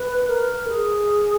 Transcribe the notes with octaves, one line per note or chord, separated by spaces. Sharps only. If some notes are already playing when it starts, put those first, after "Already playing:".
Already playing: B4
A#4
G#4